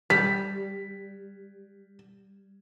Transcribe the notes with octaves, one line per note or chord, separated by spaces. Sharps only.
G3 B6